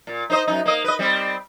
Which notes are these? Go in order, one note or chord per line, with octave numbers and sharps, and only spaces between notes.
A#2
D#4 C5 D#5
F#2 D#4
A#3 D#5
B4 D#5
G3 C4